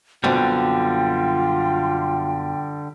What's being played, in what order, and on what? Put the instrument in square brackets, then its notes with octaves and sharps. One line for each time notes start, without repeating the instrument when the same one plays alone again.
[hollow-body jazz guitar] F#2 B2 C4 [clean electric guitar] D3 G3 [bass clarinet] F4 [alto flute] G5